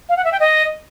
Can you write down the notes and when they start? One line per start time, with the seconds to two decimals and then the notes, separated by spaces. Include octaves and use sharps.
0.09 F5
0.17 F#5
0.24 E5
0.32 G5
0.40 D#5